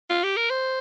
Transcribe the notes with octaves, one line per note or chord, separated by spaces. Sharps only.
F4
G4
A#4
C5